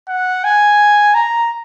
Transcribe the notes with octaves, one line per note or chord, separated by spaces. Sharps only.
F#5
G#5
A#5